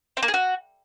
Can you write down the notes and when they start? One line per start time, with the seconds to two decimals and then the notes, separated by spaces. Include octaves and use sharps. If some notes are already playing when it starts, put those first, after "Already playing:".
0.17 C4
0.23 A#3
0.28 G#4
0.34 F#4